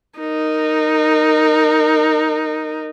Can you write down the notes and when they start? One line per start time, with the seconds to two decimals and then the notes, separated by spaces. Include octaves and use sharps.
0.19 D#4 A#4